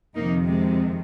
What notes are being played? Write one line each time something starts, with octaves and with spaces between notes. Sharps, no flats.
F2 C3 D#3 A#3 D#4
G#3 C4